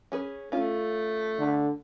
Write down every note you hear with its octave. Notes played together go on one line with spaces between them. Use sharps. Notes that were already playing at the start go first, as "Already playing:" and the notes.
C#4 G#4 B4
A3 C#4 F4
D3